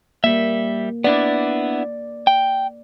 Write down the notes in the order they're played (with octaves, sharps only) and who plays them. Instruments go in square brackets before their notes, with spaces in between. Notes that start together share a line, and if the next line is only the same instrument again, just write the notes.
[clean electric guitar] G3 E5 [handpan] A#3
[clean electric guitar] B3 D4 E4 [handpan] D5
[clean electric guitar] G5